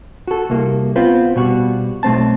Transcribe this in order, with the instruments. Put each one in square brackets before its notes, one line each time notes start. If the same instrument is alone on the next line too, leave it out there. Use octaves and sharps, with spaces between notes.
[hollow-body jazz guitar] F#4 A4
C2 A#3
B3 C4 F4
B2 G3 F#4
B1 A3 C4 A5